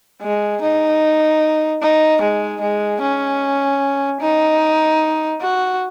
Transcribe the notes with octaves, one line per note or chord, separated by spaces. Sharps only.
G#3
D#4
D#4
G#3
G#3
C#4
D#4
F#4